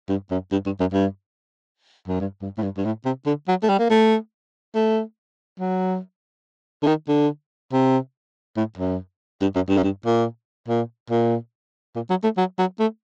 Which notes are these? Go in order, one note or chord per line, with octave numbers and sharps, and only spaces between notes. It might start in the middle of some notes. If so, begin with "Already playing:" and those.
G2
F#2
G2
G2
F#2
G2
F#2
G2
G2
A2
G2
G2
A2
C3
D3
F#3
A3
G3
A#3
A3
A3
F#3
D3
D#3
D3
C3
A2
F#2
G2
F#2
G2
F#2
G2
A#2
A#2
A#2
A#2
F#3
A3
F#3
F#3
A3